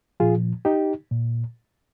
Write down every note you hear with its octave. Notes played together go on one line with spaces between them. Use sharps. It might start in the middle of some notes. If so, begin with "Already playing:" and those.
A#2 F3 F4 G#4
D#4 G4
A#2